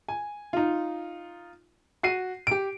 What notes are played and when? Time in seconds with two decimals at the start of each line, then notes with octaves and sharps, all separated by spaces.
0.08 G#5
0.53 D#4 F4
2.03 F#4 C7 D#7
2.47 G4 D7